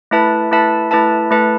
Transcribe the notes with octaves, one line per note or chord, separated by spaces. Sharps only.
A3 E4 B4 E5 A5
A3 E4 B4 E5 A5
A3 E4 B4 E5 A5
A3 E4 B4 E5 A5